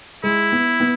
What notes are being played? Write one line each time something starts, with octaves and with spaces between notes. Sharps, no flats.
G#3 E4
B3
B3